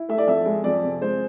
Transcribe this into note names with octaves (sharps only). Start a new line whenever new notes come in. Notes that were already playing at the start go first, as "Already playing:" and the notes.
Already playing: E4
A3 E5
D5
F2 E5
G#3
F2 D5
C3
G#3 C5